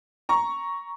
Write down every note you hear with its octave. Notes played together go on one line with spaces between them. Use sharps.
A#5 C#6